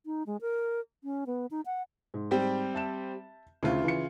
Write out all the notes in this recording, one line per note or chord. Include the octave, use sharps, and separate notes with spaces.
D#4
G#3
A#4
C#4
B3
D#4
F#5
G#2
G3 C4 G4
E5 A5 E7
D2 C#3 E4 F4
E3 C#7